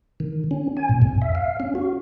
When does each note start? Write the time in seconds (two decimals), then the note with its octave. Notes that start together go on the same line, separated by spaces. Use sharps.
0.20 D#3
0.51 C#4
0.77 G#5
0.89 A#2
1.02 F2
1.22 E5
1.35 F5
1.60 C#4
1.75 F#4